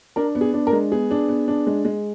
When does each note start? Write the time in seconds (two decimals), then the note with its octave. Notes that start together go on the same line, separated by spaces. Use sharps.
0.16 D4 A#4
0.35 B3
0.41 G#4
0.54 D4
0.67 A#4
0.72 G#3
0.92 B3 G#4
1.11 D4
1.29 B3
1.48 D4
1.67 G#3
1.85 G#3